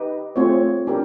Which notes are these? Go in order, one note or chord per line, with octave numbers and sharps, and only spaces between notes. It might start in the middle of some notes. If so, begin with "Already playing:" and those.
Already playing: D#4 G4 B4 D#5
A3 C4 F4 G#4 C#5
D4 G4 A#4